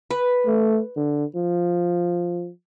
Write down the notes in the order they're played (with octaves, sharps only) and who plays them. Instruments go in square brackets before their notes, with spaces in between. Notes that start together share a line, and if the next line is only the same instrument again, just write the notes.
[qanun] B4
[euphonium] A3
D3
F3